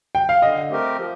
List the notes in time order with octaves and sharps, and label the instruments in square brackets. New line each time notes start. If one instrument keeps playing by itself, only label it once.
[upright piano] G5
F5
[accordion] D3 [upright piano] D#5
[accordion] A3 C4 G4 A#4
F3